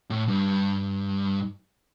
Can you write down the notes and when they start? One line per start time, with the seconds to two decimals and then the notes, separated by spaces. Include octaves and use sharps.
0.10 A2
0.28 G2